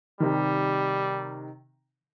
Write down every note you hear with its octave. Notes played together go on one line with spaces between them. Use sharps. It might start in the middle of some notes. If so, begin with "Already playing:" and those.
C3 D#3 G3